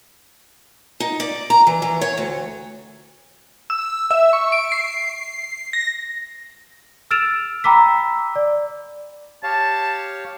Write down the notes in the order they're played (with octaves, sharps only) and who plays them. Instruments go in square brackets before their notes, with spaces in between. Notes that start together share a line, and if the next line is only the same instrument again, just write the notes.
[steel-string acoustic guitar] D#4
D5
A#5
E3
E3
C#5
D2
[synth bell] E6
E5
C#6
D7
C7
A#6
[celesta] E6 F6 A6 D7 E7 F7
G5 A#5 B5 D6 E6 B6
D5
[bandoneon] G4 C#5 F5 [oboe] A5